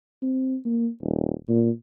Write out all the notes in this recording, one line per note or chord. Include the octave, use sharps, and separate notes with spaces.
C4
A#3
D#1
A#2